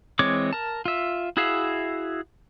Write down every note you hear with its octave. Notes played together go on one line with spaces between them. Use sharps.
E3 G#3 C4 C#5 D6
A#4 A5
F4 E5
E4 F#4 G#4 E5 F5